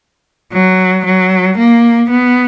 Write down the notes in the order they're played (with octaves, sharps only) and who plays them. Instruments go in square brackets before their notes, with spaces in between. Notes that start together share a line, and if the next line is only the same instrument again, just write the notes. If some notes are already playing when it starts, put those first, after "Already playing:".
[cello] F#3
F#3
A#3
B3